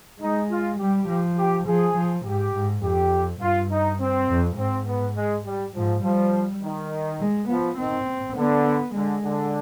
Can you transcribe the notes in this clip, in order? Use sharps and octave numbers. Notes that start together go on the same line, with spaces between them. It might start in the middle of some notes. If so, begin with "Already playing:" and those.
G#3 D#4
F4
G3 G4
F3
G4
F3 G#4
F3
G#2 G4
G#2
F2 G4
G2 F4
D#4
C4
F2
G#2 C4
B3
G#3
G3
G#2 F3
F3 G3
D#3
G#3
F3 B3
D#3 C4
D3 B3
D3 G#3
D3